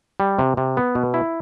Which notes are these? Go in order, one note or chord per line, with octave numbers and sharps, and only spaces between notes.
G3
C3
C3
B3
B2
E4